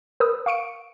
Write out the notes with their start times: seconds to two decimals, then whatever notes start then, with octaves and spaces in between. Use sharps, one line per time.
0.20 A#4 B4 D#6 E6
0.46 F5 C#6 C#7 D7